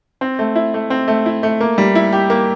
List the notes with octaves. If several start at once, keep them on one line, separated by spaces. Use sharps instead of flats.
C4
A3
E4
A3
C4
A3
E4
A3
A#3
G3
E4
G4
A#3